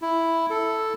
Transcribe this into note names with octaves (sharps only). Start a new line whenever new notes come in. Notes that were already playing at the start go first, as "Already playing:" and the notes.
E4
A4